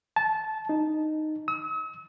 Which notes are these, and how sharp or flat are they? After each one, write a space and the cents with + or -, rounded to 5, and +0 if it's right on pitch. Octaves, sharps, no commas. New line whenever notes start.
A5 -15
D#4 -10
E6 -45